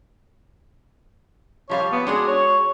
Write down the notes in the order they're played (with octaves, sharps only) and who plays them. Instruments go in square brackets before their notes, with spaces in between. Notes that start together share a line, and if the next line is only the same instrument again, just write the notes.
[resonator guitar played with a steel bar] F3 G3 F5 [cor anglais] C#5
[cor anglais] B3
[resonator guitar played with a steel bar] G#3 F#4 G#4 [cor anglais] D4
[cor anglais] C#5